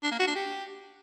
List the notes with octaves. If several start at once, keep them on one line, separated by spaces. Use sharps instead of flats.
D4
A#3
F#4
D4
G4